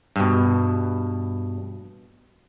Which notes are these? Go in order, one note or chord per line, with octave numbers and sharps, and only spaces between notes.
G2 B2